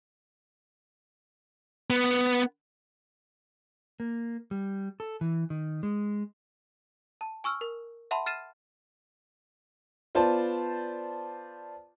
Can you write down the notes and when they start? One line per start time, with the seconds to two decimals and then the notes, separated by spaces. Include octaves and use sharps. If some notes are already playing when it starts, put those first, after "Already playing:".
1.90 B3
4.00 A#3
4.51 G3
5.00 A4
5.21 E3
5.50 D#3
5.83 G#3
7.21 A5
7.44 G#5 C#6 E6 F6
7.61 A#4
8.11 E5 F#5 A5 B5 C6
8.26 F6 A6 C7 D#7 E7
10.15 B3 F4 C5 D5 A5